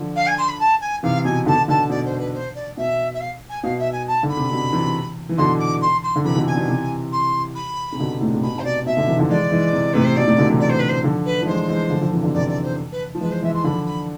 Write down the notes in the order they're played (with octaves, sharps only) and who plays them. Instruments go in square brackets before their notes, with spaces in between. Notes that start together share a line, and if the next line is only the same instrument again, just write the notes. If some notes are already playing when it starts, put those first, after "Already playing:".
Already playing: [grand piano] D3 F3
[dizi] F5
G#5
C6
B5
A5
G#5
[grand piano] C3 E3 [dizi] F5
[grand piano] B2 [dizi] G#5
[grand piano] B2 D3 [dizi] A5
[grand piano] B2 D3 [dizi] A5
[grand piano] B2 [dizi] D5
[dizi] C5
B4
C5
D5
[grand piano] B2 [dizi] E5
[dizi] E5
F5
G#5
[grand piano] B2 [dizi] F5
[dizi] E5
G#5
A5
[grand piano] D3
[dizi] B5
[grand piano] C3
B2
C3 E3
E3
[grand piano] B2 D3 [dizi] C6
[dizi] D6
C6
C6
[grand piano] D3
[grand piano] C3 E3 [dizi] B5
[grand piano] B2 D3
[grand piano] B2 [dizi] G#5
[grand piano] B2
C3 E3
[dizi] C6
B5
[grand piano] C3
B2 D3
A2 C3
C3
[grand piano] B2 [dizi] B5
[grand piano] C3
[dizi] C5
[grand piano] B2 [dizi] D5
[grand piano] B2 [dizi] E5
[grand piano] B2 D3
C3 E3
D3 F3
[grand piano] E3 G#3 [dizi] D5
[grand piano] E3 G#3
C3 E3
[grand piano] A2 C3 [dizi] B4
[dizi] C5
[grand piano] B2 [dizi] D5
[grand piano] A2 C3
B2 D3
C3 E3
[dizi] D5
C5
B4
C5
[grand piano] D3 F3
[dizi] B4
[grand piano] F3
[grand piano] E3 G#3 [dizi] C5
[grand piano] E3 G#3
D3 F3
D3 F3
C3 E3
B2 D3
[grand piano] C3 E3 [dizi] D5
[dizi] D5
C5
B4
[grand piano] F3
[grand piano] E3 G#3 [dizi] B4
[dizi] C5
[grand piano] E3 G#3 [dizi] E5
[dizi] C6
[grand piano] D3 F3 [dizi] B5
[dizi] B5